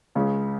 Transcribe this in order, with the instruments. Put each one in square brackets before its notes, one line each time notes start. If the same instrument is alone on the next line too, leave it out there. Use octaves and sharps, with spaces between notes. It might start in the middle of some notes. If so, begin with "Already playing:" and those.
[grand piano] C#2 C#3 G#3